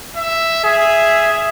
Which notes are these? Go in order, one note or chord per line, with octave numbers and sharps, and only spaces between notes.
E5
G#4 E5